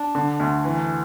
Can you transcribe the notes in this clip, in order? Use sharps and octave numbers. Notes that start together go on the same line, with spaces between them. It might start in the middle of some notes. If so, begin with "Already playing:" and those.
Already playing: D4
D3
D2
E3